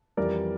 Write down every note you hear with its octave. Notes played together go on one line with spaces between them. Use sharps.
F2 E3 G3 A#4 D5